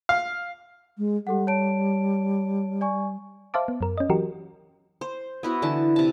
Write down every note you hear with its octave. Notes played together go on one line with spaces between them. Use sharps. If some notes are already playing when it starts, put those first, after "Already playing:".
F5
G#3
G3 G4 A4 F#5
C#5 A5 D7
D5 G#5 C#6
C5 E5 F5 A5 D6
B3
F#2 A#4
C#4 D#5
E3 F#3 F#4 G4 A#4
C5
B3 E4 F#4
D3 E3 A5
C3 A5